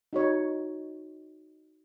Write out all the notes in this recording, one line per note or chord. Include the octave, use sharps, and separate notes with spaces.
D#4 F#4 C#5